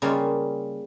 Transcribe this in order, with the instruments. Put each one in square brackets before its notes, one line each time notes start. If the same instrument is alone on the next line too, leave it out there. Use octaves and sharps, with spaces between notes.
[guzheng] C#3 G3 A#3 C#4 F4